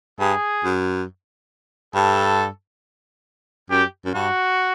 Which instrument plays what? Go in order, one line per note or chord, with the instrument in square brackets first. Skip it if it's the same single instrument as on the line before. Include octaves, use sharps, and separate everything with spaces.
[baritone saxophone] G2 [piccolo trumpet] G#4
[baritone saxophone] F#2
[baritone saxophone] G2 [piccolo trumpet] A4
[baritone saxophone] F#2 [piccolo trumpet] G4
[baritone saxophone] F#2
[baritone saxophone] G2 [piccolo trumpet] F#4